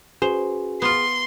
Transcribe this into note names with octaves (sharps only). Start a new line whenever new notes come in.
C#4 F#4 G#4 B4 C5
B3 F4 C6